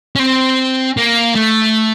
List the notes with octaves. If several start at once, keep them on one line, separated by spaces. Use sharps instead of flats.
C#4
C4
A#3
A3